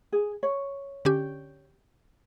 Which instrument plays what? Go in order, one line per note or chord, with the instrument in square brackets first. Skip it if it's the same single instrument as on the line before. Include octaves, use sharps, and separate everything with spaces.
[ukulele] G#4
C#5
[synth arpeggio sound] D3 C#4 G4